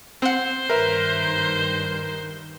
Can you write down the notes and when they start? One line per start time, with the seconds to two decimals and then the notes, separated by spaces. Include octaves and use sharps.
0.22 C4 C5 F#5
0.70 G2 D#3 A#4 B4 E5